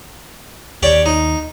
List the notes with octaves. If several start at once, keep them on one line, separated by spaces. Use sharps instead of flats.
D#2 G4 C#5 D5
D#4